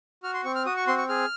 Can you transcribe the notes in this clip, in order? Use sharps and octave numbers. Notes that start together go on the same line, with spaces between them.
F#4 F6
C6
C4 C#6
F6
F#4 D#6
C#6
C4 C6
C#6
G#4 F6